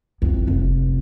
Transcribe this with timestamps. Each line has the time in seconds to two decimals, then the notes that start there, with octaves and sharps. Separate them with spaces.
0.22 F2 E3
0.47 F1